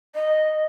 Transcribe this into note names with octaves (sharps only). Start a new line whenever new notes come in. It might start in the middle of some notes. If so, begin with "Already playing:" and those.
D#5